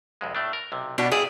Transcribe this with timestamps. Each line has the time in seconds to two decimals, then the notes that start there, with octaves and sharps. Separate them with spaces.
0.21 C2 F2 G#3
0.35 A2 A3 D4
0.53 A#4
0.72 B1 C3
0.98 B2 D4 F#4 G4
1.12 G2 E4 G#4 D5